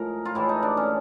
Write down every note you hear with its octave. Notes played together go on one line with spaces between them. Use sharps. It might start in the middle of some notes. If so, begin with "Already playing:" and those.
Already playing: A2 F3 G#3 A#4
F4
A2 E3 G#3 E4
D#4
D4
C#4